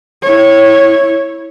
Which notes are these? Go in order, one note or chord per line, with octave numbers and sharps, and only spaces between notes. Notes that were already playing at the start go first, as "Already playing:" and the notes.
E4 C#5